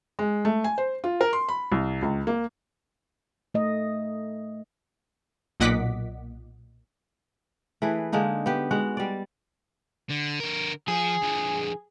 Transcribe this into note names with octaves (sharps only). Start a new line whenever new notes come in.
G#3
A3
G#5
C5
F4
A#4
C6
B5
C2
C#2
A#3
A3 D#5
B1 A#2 D#5 F#5 D6 B6
E3 A3 G#4 B4
D3 G#3 A#3 D#4
B3 G4
G#3 F#4 F#5
G3 D5
D3
D3 A#4
F3 G#4
D3 F3